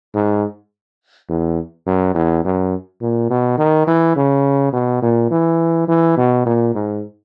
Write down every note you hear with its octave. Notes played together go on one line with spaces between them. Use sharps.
G#2
E2
F#2
E2
F#2
A#2
B2
D#3
E3
C#3
B2
A#2
E3
E3
B2
A#2
G#2